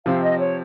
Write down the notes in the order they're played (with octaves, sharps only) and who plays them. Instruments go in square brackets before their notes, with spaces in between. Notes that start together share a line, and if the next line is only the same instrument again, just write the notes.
[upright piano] C3 F3 C4 [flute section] F5
[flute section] D#5
C#5